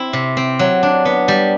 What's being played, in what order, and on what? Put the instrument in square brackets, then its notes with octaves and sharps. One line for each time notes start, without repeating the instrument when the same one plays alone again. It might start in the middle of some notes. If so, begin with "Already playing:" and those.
Already playing: [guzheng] C4 E4
C3
C4
F#3
D4
B3
G3